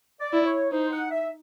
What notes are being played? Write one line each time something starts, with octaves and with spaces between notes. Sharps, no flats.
D5
E4
C#5
D#4 C5
F#5
E5